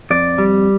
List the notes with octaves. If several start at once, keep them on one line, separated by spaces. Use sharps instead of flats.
F2 D5
G3